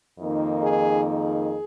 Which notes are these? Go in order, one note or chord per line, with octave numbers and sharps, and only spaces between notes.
F2 D#3 A#3 D#4
G#4
G#4